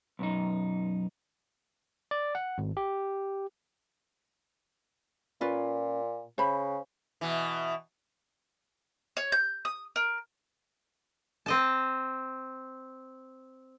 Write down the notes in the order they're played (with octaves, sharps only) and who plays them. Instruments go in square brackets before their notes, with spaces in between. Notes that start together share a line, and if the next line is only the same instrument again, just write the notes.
[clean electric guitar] B1 F#2 D#4
[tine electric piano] D5
F#5
G#1
G4
[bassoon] A#2 [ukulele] C#4 F4 B4
[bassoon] C#3 [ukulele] C5 B5
[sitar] B2 E3
[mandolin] C#5
G6
D#6
A#4
[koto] C4 D#5 A5